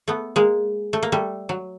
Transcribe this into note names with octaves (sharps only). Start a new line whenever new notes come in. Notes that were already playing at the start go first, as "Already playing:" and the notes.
A3 B3
G#3 A#3
A3
A#3
G3 A3
F#3